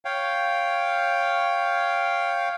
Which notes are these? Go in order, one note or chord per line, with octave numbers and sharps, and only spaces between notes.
C#5 F5 G5